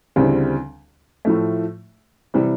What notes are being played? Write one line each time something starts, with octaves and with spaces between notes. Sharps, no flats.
D2 C#3 E3 G3 C4
A2 F3 A3
C3 E3 G3